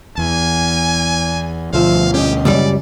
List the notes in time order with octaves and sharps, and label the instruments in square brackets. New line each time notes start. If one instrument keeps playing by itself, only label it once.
[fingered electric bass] E2 [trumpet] G#5
[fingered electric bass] D2 B2 [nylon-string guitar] F3 E5 [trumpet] F5
[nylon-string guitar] C#4 D#5 [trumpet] G4
[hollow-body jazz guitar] C#2 F#2 G3 [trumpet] D5